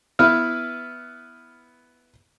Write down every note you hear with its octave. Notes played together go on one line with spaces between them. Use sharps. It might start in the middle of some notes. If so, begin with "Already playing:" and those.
B3 E4 B4 F6